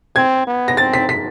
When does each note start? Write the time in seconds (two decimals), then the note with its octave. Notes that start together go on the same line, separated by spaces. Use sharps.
0.16 C4 G#6
0.47 B3
0.68 A#6
0.77 C4 A6
0.93 B6
1.09 B6